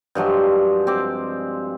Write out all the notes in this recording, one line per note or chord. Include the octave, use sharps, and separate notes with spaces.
G2 F3 F#3 G#3
C4 D6